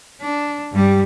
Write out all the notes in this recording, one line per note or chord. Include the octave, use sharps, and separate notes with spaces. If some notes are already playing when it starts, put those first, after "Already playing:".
D4
G2 G3